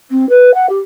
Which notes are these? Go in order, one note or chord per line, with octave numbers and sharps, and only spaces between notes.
C4
B4
F#5
G4